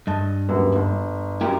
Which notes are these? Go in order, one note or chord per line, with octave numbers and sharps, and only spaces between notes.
G2 D#5 A5
D#1 F#2 B3
G1
F#2 E4 G4 A#4